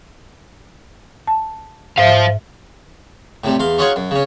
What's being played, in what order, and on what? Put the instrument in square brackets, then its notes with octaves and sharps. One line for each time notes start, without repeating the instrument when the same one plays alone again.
[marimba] A5
[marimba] G#2 E5 [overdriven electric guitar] C5 F5
[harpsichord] A2 C3 G3
E2 F5 C6
C#4 D#4 F4 F#4 G#4 C#5
F#2
C#3 C#4